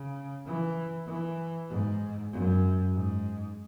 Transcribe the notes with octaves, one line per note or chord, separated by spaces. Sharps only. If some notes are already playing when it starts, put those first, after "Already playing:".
Already playing: C#3
E3
E3
G#2
F#2
G#2